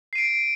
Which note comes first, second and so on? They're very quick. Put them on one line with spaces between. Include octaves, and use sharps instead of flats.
C7 D#7 D7